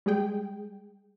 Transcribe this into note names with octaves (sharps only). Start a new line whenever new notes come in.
G3 G#3 G#4 G5